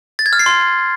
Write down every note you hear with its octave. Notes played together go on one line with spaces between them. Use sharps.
A6
G#6
F6
C7
C6